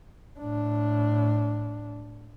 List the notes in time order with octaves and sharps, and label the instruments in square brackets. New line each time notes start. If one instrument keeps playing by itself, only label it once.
[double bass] A2 D4